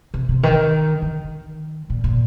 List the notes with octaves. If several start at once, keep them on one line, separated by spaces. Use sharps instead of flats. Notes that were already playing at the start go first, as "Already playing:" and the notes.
C3
C3
D#3
D#3
A#2
A#2